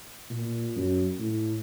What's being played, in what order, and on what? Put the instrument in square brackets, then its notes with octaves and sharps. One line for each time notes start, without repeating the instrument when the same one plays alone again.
[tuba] A#2
F#2
A2